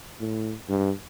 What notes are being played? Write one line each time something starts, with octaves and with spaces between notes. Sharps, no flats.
A2
G2